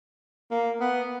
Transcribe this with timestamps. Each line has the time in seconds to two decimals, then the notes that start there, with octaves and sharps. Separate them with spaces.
0.51 A#3
0.80 B3